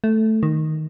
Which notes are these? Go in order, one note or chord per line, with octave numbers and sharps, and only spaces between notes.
A3
D#3